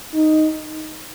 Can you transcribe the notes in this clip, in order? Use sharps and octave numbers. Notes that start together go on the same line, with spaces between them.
D#4